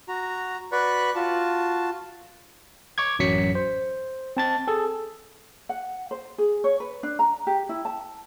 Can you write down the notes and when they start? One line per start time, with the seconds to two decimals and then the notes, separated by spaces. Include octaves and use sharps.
0.08 F#4 A#5
0.72 F#4 B4 D5 B5 C#6 F#6
1.15 F4 F#4 A5
2.98 C#6 D6 G#6
3.19 A1 F#2 F#3 B6 C#7
3.55 C5
4.37 C4 A5 A6
4.67 G#4 A4
5.69 F#5
6.11 C5
6.38 G#4
6.64 C#5
6.80 B4
7.03 D4
7.19 A#5
7.47 G4
7.69 E4
7.85 A5